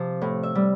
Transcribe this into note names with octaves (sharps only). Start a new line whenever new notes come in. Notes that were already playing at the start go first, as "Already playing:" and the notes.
Already playing: C3 F3
A2
E5
G3